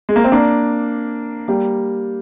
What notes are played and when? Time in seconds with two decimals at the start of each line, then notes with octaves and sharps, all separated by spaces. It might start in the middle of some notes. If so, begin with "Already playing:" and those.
0.09 G#3
0.16 A#3
0.24 C4
0.32 A#3 D4
1.48 G3 A#3